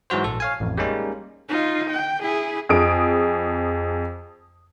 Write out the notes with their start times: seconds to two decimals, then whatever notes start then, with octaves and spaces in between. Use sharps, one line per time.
0.10 G#2 E3 F#3 F#4 C5
0.24 A#1 A4
0.40 C#5 F5 G#5
0.60 A1 F2
0.77 G3 G#3 A#3 C#4 D#4
1.49 D#4 F4
1.90 G5
2.22 E4 G#4
2.69 F2 G#4 D#6 D7